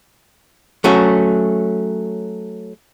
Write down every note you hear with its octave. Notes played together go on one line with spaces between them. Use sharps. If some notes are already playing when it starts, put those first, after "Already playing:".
F#3 A3 C#4 F#4